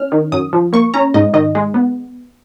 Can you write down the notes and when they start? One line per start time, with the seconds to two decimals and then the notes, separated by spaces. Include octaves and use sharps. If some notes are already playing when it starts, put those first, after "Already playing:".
Already playing: C#4 F6
0.12 D#3
0.32 F#2 D#6
0.53 F3
0.73 A#3 C#6
0.94 C#4 A#5
1.14 G#2 D#5
1.34 D#3 D#5
1.55 G#3
1.74 B3